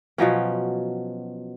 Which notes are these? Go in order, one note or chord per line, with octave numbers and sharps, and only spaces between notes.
B2 F3 F#3 C#4